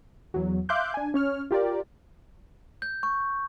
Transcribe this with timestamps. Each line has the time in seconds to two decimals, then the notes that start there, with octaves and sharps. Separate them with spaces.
0.34 E2 F#3
0.69 E5 F5 C6 D6 F#6 G6
0.94 D4 G#5
1.14 C#4 C#5 F6
1.51 F4 G4 A#4 D5
2.82 G6
3.03 C#6